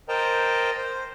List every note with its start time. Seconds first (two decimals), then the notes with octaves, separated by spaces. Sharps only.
0.09 A#4 C5 D#5 G5 A5 A#5
0.77 C5